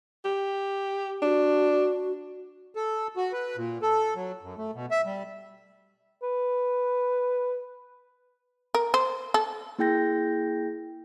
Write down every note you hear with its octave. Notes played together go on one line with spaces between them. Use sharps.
G4
D4 F#4
A4
F#4
B4
A#2
A4
F#3
F#2
A3
B2
E5
G3
B4
A#4
C5
A4
A#3 E4 G#4 G5 G6 A#6